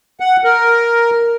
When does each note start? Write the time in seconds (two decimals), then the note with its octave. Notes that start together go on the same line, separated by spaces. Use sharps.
0.20 F#5
0.44 A#4